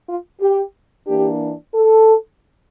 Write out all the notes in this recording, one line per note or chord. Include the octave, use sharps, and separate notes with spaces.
F4
G4
E3 A#3 D4 G4
A4